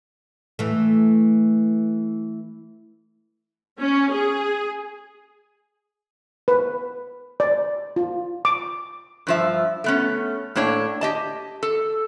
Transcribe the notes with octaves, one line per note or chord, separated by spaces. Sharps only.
E3 A3
C#4
G#4
B4
D5
F4
D6
G2 F3 E5
A3 B3 C#4
A2 A#3 D4 C#5
G4 D#5 A5
A4